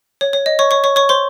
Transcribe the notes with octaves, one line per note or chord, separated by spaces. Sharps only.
C#5
C#5
D#5
C#5 C#6
C#5 C#6
C#5 C#6
C#5 C#6
C5 C6